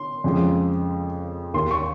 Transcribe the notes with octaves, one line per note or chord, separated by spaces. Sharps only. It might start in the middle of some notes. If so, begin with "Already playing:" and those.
Already playing: C6
F2 C#3 F3 G#3
D#2 D#3 A#3 C6
C#6